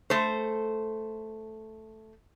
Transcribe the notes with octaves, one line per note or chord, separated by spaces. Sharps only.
A3 C5